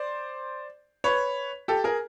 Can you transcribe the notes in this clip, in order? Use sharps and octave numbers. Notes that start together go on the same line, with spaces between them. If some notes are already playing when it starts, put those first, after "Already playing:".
Already playing: C5 D5
B4 C#5
G4 A4
G#4 A#4